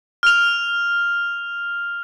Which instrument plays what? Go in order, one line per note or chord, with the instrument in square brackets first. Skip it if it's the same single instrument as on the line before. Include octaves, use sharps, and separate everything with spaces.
[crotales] F6 F7